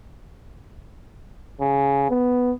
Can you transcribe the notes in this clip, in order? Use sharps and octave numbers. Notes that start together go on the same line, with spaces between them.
C#3
B3